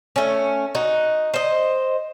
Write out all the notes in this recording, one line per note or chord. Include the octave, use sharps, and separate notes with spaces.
A3 C#4
D#4 F#4
C5 D#5